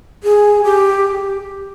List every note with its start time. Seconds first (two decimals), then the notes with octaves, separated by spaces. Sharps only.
0.24 G#4
0.64 G4